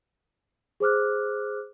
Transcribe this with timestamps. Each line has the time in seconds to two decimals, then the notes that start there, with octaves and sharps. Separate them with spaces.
0.80 G#4 C5 D6 F6 F#6